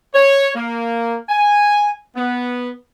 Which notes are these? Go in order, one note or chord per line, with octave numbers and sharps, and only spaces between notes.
C#5
A#3
G#5
B3